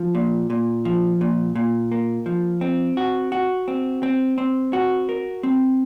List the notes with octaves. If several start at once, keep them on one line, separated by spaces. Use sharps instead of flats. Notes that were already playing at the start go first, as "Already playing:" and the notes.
Already playing: F3
A#2
A#2
F3
A#2
A#2
A#3
F3
C4
F#4
F#4
C4
C4
C4
F#4
A#4
C4